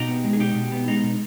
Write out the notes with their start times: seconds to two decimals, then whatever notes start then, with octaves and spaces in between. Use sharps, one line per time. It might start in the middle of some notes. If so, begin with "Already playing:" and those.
Already playing: B2 D#4 G4
0.08 B3
0.24 G#3
0.33 G#4
0.40 B2 D#4 G4
0.55 B2
0.72 B3
0.88 G#3 D#4
1.04 B2